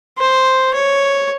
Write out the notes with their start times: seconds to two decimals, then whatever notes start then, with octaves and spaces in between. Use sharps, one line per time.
0.19 C5
0.74 C#5